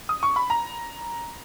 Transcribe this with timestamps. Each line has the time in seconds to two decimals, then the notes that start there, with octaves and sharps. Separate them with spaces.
0.09 D#6
0.23 C#6
0.36 B5
0.50 A#5